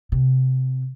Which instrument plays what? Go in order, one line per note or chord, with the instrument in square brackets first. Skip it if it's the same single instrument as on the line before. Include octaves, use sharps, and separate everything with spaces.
[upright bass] C3